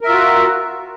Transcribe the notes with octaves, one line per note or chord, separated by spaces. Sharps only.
F4 F#4 A#4 E5